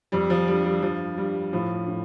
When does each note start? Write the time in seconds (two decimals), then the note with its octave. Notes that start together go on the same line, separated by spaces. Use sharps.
0.12 F2 G3
0.30 F3
0.47 D3 G3
0.65 G3
0.82 G2 F3
1.17 G2 G3
1.53 A2 F3
1.88 A2